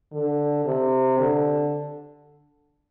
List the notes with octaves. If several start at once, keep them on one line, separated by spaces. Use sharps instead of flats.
D3
C3
D3